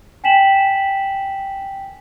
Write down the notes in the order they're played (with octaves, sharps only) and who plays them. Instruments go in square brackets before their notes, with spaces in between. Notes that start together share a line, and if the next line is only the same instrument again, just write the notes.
[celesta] G5 G#5 B6 E7 F#7